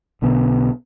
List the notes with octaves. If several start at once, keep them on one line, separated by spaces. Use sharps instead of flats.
B1 B2 D3 B3